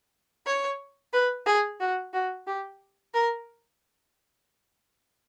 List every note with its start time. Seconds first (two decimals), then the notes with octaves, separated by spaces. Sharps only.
0.46 C#5
1.13 B4
1.46 G#4
1.80 F#4
2.13 F#4
2.47 G4
3.14 A#4